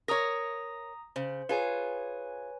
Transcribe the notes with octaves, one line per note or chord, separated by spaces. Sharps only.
A#4 C#5 A#5 D#6 A#6
C#3 C5
F4 G#4 B4 C#5 G#5